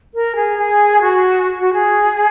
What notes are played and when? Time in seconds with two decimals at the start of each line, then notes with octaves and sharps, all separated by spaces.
0.14 A#4
0.36 G#4
0.58 G#4
1.01 F#4
1.60 F#4
1.73 G#4